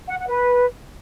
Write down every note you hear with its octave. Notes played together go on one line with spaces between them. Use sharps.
F#5
F#5
B4